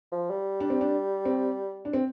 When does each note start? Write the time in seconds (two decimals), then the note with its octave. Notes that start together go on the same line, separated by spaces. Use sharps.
0.12 F3
0.30 G3
0.60 D4
0.70 C4
0.81 D4
1.25 C4
1.85 D4
1.93 C4